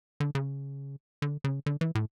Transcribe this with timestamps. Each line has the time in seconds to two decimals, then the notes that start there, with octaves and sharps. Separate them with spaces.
0.20 D3
0.35 C#3
1.22 D3
1.44 C#3
1.66 D3
1.81 E3
1.95 A2